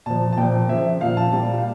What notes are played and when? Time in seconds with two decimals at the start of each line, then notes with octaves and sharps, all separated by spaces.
0.06 A#2 F3 A5
0.33 A5
0.37 A#2 F3 G5
0.69 C#3 F3 E5
1.01 A#2 F3 F5
1.17 A5
1.33 A#2 G3 A5
1.58 F5